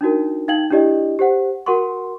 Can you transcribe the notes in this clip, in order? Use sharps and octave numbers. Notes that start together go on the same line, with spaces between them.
D4 D#4 F#4 A#4
D#4 F5 G5 G#6 F#7
D4 E4 G4 D5 D#5
G4 C5 F#5
F#4 A#4 F#5 C6 C#6